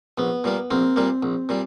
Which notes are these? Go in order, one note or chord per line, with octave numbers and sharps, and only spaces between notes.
A#1 B3
A#2 G3 A#3
A#1 A#3 C4
A#2 G3 A#3
A#1
A#2 G3